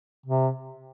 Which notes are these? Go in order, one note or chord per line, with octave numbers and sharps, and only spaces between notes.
C3